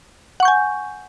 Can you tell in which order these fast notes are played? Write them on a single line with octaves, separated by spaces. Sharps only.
F#5 C#6 G6 G#5